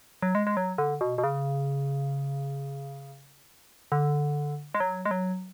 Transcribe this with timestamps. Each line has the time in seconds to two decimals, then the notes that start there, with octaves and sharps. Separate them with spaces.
0.22 F#3
0.35 G#3
0.47 G#3
0.57 F#3
0.78 D3
1.01 B2
1.18 B2
1.24 C#3
3.92 D3
4.74 G#3
4.80 F#3
5.05 G#3
5.11 F#3